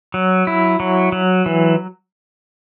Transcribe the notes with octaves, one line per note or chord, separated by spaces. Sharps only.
F#3
E4
F#3
F#3
E3